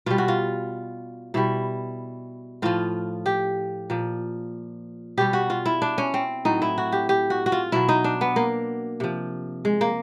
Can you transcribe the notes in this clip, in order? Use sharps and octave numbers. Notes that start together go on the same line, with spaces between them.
B2 G3 F4
F#4
F4
B2 G3 E4
A2 F3 F4
G4
A#2 F3
B2 G3 G4
F#4
F4
E4
D4
C#4
C4
A2 F#3 D#4
E4
F#4
G4
G4
F#4
F#4
F4
B2 F#3 E4
D#4
D4
B3
A#3
C3 F3
G#3
A#3